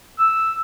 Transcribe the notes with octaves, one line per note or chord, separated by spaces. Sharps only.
E6